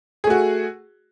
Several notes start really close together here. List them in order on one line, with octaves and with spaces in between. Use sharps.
G#4 A3 F#4